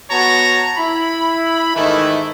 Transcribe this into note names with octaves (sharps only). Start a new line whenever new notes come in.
B3 F#4 C#5 A5 A#5
E4 B5
G#2 D#3 E3 A3 E4